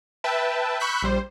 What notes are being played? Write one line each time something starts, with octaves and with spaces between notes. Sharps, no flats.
B4 E5 G5 A5
B5 C#6 E6 F#6 G6 B6
A#1 G3 C5